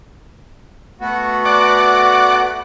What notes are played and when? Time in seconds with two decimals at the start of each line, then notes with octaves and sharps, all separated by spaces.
1.01 A3 B3 F#4
1.45 D5 F#5